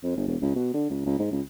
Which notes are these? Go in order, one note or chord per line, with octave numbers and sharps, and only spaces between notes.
F2
G1
E1
C#2
B2
D3
C#2
C#2
G#2
C#2